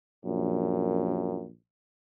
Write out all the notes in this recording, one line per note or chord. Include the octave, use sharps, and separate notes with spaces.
A#1 F#2